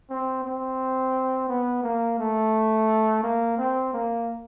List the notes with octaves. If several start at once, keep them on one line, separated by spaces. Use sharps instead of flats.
C4
C4
B3
A#3
A3
A#3
C4
A#3